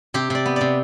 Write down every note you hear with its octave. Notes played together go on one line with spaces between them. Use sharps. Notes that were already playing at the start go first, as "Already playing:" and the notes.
C3 G4
C3 D5
B3
C3 D5